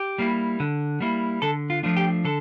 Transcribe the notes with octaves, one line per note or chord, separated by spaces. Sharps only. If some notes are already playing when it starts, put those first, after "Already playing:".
Already playing: G4
G3 A#3 E4
D3
G3 A#3 E4
D3 A4
F4
F3 A3 D4 F4
G4
D3 A4